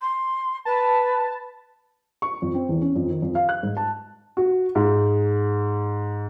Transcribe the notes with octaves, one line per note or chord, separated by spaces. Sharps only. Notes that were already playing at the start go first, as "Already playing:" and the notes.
C6
B4 A5
C#6
F2
C4
E2
C#4
F2
D#3
F2
F5
F#6
G#2
A5
F#4
G#2